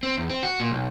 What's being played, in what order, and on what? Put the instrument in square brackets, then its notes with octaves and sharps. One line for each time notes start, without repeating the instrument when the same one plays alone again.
[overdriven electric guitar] C4
E2
C4
F#4
A#2
B1